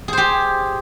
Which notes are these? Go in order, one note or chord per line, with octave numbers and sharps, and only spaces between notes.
G4 G#4 C5